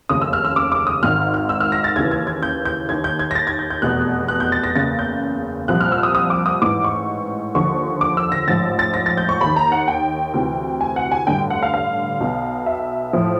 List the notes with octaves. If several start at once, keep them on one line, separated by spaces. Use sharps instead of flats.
F1 D#2 C#3 D#6
E6
F6
E6
D6
D6
D#6
G#1 G#2 D#3 F6
F6
E6
F6
A#6
A6
D#2 C#3 E3 G#6
G#6
G#6
G6
G6
D#2 D#3 G#6
G6
G#6
A#6
A6
G#6
G6
G6
F1 E2 B2 F#6
F#6
G6
A6
A#6
F#1 E2 C#3 A6
G6
C2 A#2 F3 F#6
F6
E6
D#6
D#6
D6
D#6
A1 G#2 E3 D6
C#6
D#2 D3 F3 C#6
D6
E6
A#6
A1 G#2 F3 A6
A6
A#6
A6
G6
C#6
D#2 D#3 B5
A#5
F#5
G5
D2 C3 E3
G#5
F#5
G#5
A1 G2 D3 G5
F#5
F5
F5
B1 B2
E5
A2 F3